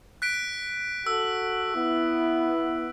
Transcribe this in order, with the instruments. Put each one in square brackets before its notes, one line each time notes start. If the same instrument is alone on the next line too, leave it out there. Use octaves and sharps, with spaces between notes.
[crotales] F#6 B6 D7
[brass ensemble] F#4 A4 [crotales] E6
[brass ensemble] B3 E4